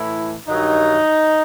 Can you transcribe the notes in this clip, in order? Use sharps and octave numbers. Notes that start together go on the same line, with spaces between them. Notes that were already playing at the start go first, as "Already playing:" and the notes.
Already playing: A2 E3 E4
G2 D#3 F#3 D#4